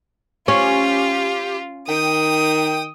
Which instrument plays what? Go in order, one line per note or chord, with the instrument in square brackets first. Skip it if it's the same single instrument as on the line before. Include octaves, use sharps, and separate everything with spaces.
[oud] C#4 [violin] F4 [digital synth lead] G4
[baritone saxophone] D#3 [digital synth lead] G5 [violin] D#6